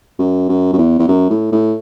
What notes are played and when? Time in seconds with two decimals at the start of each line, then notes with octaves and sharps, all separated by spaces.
0.19 F#2
0.49 F#2
0.73 F#2
0.78 E2
0.99 E2
1.08 F#2
1.30 A2
1.52 A2